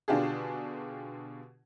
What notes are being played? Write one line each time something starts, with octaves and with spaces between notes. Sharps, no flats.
B2 D3 D4 F4 G4 G#4